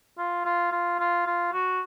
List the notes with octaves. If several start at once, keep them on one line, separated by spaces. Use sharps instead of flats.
F4
F4
F4
F4
F4
F#4